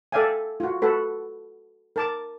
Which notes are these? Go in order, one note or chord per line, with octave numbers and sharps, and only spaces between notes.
A4 D5 E5 F5 G5 G#5
F4 F#4
F#4 A4 B4
A#4 A5 D6